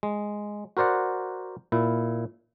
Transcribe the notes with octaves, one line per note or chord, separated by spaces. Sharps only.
G#3
F#4 A#4 C5 D5 F#5
A#2 E4